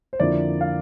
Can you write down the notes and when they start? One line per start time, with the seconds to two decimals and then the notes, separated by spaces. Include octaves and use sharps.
0.13 C5
0.20 F2 D3 F3 A#3 E4 D5
0.61 F5